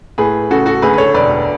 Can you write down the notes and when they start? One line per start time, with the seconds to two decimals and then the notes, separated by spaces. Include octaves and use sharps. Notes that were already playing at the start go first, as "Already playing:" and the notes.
0.18 A2 G#4 B4
0.50 C#3 F#4 A4
0.66 F#4 A4
0.82 D2 G#4 B4
0.93 B4
0.98 A4 C#5
1.14 E1 B4 D5